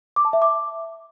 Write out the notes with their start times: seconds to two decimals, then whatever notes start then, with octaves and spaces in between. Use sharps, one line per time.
0.16 D6
0.25 A5
0.33 E5
0.42 D6